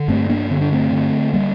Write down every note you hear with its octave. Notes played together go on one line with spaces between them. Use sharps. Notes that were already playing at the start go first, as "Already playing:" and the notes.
Already playing: D3
G2 A3 C4
A#3 D4
D3 C4
D4
A3 C4
D3
G3 A#3